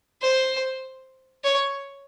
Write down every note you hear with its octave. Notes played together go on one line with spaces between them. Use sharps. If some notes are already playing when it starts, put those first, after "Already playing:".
C5
C#5